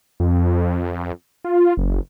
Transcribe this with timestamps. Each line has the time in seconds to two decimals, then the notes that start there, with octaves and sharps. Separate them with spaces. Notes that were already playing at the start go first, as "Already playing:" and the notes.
0.20 F2
1.44 F4
1.77 F#1